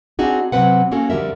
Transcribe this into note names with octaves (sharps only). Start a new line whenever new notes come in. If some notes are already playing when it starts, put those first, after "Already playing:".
C4 D4 D#4 F#4 G#4
C3 F#3 C4 B4 F#5
A#3 C#4 F#4 A4
F2 D3 G3 A#4 E5